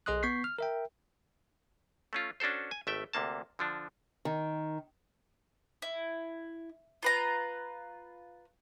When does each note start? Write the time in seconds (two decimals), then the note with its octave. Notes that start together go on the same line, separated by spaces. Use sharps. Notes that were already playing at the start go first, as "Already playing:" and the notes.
0.06 B1 G#4 D#5 C6 D#6 F#6
0.23 B3 C#6 G6 B6 C7
0.44 F6
0.59 A#4 E5 G5
2.13 A3 C#4 F4
2.40 C#4 D4 F#4 A4 C5
2.71 G#5
2.87 G#1 A3 E5 G5
3.13 D2 C3 A#3 A5
3.59 D3 F3 D4
4.25 D#3
5.82 E4
7.03 F4 B4 A#5